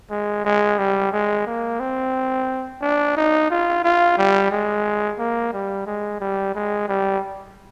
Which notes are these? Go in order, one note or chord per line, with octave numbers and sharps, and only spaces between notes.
G#3
G#3
G3
G#3
A#3
C4
D4
D#4
F4
F4
G3
G#3
A#3
G3
G#3
G3
G#3
G3